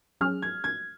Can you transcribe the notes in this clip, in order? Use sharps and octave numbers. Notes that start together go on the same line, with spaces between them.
F#3 C#4 G#4 F6
G#6
G#6